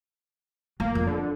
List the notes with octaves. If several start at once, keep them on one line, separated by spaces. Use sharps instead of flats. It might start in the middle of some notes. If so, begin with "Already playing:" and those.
F#3 A#3
F2
D3